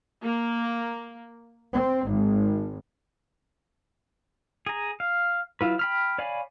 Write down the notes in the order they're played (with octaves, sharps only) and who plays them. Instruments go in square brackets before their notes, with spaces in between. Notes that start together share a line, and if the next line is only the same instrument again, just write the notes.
[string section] A#3
C4
G#1
[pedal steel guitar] G#4 A#5
F5
F#3 E4 F4 B4
G5 B5 F6
C#5 D5 F5 G#5 B5